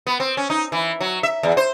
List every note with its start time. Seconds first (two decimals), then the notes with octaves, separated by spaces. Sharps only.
0.07 B3
0.20 C4
0.37 C#4
0.50 D#4
0.72 E3
1.01 F#3
1.23 E5
1.43 E2
1.57 C5